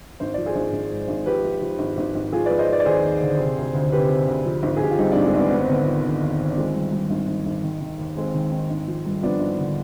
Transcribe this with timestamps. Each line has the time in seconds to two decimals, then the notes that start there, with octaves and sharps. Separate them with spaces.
0.20 G#1 C5
0.34 F3 D5
0.46 G#4 C5
0.56 G#1
0.73 G#1
0.91 G#2
1.08 G#1
1.26 F3 G4 B4
1.44 F3
1.61 F3
1.79 G#1
1.98 G#1
2.15 G#1
2.32 F3 F4 G#4
2.46 F3 B4 D5
2.59 C5 D#5
2.69 F3 B4 D5
2.80 D5
2.85 D#2 G#4 C5
3.03 D#2
3.22 D3
3.39 C3
3.57 D2
3.74 D2
3.92 C3 G4 B4
4.09 C3
4.28 D2
4.45 F3
4.63 G#1
4.77 G#4
4.81 G#1 G4
4.91 F4
4.98 G2 C4 D#4
5.11 G#1 D4 F4
5.25 G#3 C4
5.34 G#1 B3 D4
5.51 D#2 B3
5.60 C4
5.68 D3 B3
5.86 F3
6.04 D3
6.22 D#2
6.40 D#2
6.50 D4
6.57 F3 G#3 C4
6.75 G2
6.92 G2
7.10 G#1
7.28 G#1
7.46 G#1
7.63 D#3
7.81 D#3
7.99 D#2
8.16 D#2 G#3 C4
8.34 D#3
8.51 D#3
8.70 G#1
8.87 F3
9.05 G2
9.23 F3 B3 D4
9.40 G#1
9.59 D3